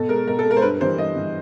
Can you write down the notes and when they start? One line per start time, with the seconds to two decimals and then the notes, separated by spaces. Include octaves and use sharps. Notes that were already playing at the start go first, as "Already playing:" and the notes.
Already playing: B2 A4
0.09 G#3 A#4
0.27 B2 A#4
0.39 A4
0.45 G#3
0.51 A#4
0.57 C5
0.62 G2 B4
0.81 E3 G3 C5
0.98 G2 D#5
1.15 E3 G3